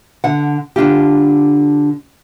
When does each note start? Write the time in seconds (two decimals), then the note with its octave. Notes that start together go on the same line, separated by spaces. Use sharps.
0.24 D3 F#5
0.76 D3 D4 F4 G4